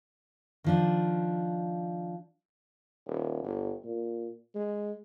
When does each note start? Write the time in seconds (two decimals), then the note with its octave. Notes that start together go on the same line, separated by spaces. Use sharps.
0.64 D#3 F3 D4
3.07 D#1
3.44 G1
3.84 A#2
4.55 G#3